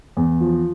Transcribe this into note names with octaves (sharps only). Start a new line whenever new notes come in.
E2
F3